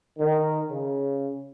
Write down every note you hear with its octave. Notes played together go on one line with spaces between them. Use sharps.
D#3
C#3